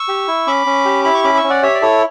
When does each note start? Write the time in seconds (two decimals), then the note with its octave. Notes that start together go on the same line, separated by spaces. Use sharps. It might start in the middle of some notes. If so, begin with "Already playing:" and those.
Already playing: C#6 E6
0.08 G4
0.28 E4
0.47 C#4 B5 D6
0.67 C#4
0.85 G4
1.04 E4 B5
1.15 C#6
1.24 C#4 B5 D6
1.37 C#6 E6
1.44 C#4
1.50 D5 F#5
1.63 G4 C#5 E5
1.75 D5
1.82 E4 A4 C#5